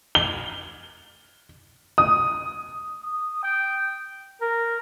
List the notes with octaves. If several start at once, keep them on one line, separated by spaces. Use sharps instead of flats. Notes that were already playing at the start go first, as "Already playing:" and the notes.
G7
D#6
D#6
G5
A#4